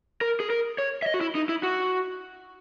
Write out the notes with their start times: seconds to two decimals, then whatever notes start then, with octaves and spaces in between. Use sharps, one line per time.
0.21 A#4
0.40 G#4
0.50 A#4
0.78 C#5
1.02 E5
1.06 D#5
1.14 F#4
1.21 E4
1.35 D#4
1.49 E4
1.63 F#4